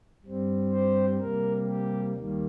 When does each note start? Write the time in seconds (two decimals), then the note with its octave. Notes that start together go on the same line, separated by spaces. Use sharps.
0.24 G2 G3 C4
0.72 G4 C5
1.19 C3 G3 A#3 A#4
1.67 G4
2.15 D#2 D#3 G3 A#3